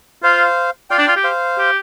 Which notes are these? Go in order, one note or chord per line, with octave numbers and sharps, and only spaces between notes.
F4 C5 F5
F4 D5 G5
D4
F4
G4
C5 F5
G4